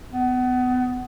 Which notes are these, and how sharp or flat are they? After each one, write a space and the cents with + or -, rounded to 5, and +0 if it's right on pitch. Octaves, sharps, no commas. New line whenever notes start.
B3 +30